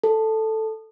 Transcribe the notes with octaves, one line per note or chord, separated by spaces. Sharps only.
A4